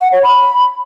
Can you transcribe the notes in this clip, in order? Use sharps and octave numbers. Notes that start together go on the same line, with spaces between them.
F#5
C#5
B5